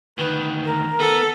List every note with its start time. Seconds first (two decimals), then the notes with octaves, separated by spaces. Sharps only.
0.18 D2 D#3 B4
0.65 A#4
1.00 B3 A4